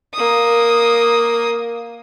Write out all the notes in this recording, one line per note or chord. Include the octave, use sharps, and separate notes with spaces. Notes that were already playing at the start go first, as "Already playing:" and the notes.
A#3 D#6